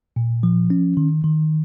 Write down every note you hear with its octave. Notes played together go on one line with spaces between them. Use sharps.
A#2
F3
C#4
D#3
D#3